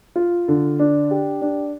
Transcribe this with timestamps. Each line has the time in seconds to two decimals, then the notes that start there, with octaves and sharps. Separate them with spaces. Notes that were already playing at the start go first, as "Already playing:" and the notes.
0.16 F4
0.48 D3
0.79 D4
1.11 G4
1.42 D4